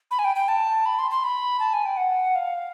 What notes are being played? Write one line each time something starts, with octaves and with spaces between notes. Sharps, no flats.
B5
G#5
G5
G5
A5
B5
C6
C6
B5
A5
G#5
G5
F#5
F5